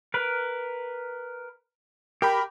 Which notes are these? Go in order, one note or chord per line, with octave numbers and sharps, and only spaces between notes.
A#4 B4
G4 A#4 G5 B5